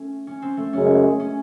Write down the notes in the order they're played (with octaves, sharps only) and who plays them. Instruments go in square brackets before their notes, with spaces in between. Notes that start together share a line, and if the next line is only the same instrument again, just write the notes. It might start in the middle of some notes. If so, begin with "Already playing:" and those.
Already playing: [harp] A3 C#4
C#4
C4
A3
[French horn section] F#2 C#3 G#3 [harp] C#4
[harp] C#4